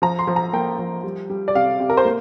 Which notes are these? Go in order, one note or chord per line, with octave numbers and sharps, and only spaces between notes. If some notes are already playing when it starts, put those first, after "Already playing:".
F3 A#5
C6
F3
A#5
A#3 G5
F3
G3
G3
D5
C3 F5
C3
A#4
C5
A#3